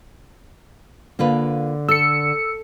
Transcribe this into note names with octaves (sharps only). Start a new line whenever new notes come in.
D3 A#3 F4 B4
A4 E6 C#7